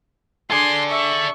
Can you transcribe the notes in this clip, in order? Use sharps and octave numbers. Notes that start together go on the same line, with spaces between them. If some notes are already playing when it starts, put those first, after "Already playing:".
D4 G#4 A4 D5 G#5 C6
E5 C#6